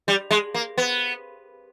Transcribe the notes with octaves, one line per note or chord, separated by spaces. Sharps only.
G3
G#3
A#3
B3